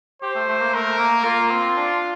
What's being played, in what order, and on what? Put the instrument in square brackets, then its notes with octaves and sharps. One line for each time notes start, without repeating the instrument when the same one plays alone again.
[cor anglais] G4 [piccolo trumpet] C5
[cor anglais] A3
A3
A#3
[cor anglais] A3 [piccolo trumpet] A#4
[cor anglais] A#3
[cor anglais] A#3 [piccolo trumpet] F4
[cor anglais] C4
D4